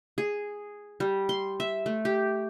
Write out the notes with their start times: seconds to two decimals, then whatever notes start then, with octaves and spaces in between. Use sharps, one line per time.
0.18 G#4
1.00 G3
1.29 C6
1.60 E5
1.86 A3
2.05 G4